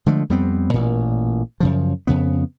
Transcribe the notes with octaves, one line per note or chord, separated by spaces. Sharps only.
D3 F3 G#3 A3
F2 G3 B3 C4
A1 A#2
F#2 C#3 F3
F2 C#3 B3